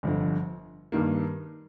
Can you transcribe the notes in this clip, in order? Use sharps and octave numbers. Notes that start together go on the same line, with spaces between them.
G1 F2 D3
G2 D#3 A#3